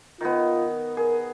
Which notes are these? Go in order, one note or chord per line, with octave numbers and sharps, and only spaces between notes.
D#3 B3 F4
G#4 A#4